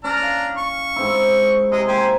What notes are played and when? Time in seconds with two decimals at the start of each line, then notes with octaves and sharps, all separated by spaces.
0.04 C#4 D4 A#5 F6
0.19 E4 F5
0.57 C#6
0.96 G#2 C4 E4
1.72 C3 G#3 D#5
1.88 A#3 G4 C5 G#5